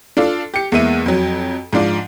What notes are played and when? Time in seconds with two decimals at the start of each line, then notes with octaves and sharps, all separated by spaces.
0.17 D4 F4 A4
0.54 G4 C#7
0.72 E2 G#3 A#3 E5 D#7
1.06 F2 F#3
1.73 G#2 F3 D4 F4